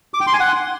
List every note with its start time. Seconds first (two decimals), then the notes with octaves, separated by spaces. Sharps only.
0.14 D6
0.20 G5
0.27 C6
0.33 G#5
0.40 F#5